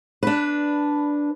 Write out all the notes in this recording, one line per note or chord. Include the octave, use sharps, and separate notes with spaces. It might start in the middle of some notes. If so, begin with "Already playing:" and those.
D4 B4